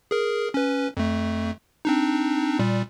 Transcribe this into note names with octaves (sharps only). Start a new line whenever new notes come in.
G#4 A#4
C#4 B4
F2 A3
C4 D4 D#4
A#2 G3